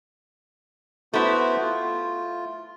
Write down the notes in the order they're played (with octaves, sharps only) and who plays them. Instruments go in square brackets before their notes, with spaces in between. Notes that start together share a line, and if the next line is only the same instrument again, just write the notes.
[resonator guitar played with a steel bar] A3 E4 [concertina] B3 F#4 C5
[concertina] F4